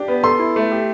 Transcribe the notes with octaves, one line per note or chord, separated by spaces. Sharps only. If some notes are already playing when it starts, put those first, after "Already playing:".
Already playing: D4 G4
B3
A4 C6
E4
A3
G4